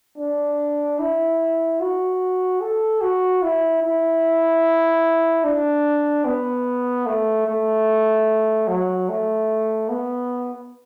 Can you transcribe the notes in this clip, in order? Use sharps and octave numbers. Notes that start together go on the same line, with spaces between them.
D4
E4
F#4
A4
F#4
E4
E4
D4
B3
A3
A3
F#3
A3
B3